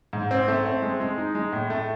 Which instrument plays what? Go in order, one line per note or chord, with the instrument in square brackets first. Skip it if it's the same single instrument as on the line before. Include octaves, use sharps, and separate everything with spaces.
[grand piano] G#2
C4
A3
C4
G#3
G#3
D#4
G#3
A2
A3